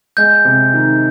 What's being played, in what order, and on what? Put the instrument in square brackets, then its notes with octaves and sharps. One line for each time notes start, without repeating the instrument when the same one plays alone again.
[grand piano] G#3 [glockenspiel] G6
[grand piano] C3
D#3